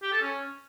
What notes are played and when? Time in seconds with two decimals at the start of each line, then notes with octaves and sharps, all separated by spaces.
0.02 G4
0.12 A4
0.21 C#4